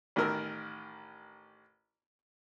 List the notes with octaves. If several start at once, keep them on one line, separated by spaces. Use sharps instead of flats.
A1 D#3 A#4 E6